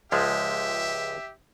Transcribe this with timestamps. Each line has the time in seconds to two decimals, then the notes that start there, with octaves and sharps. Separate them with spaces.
0.12 C#2 F3 G#3 G4 E5